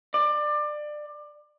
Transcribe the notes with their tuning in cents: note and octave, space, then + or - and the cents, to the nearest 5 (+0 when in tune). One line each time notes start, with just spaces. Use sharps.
D5 +25